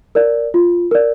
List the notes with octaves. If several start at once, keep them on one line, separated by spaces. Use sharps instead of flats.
A#4 D5
F4
A#4 D5